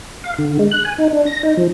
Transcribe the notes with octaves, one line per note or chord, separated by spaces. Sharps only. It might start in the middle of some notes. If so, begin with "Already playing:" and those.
F5
D3
G#3
F#6
G#5
D#4
D4
A#6
D#4
F3